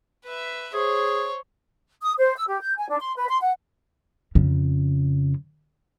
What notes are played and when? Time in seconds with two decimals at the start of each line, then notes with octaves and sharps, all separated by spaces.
0.25 B4 E5
0.74 G#4 C5 C#5
2.03 D#6
2.17 C5
2.36 E6
2.48 G4
2.61 G6
2.78 G#5
2.89 D4
3.00 C6
3.16 B4
3.29 C6
3.41 F#5
4.35 F2 C#3